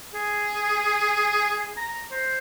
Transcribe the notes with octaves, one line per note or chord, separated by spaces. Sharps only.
G#4
A#5
C5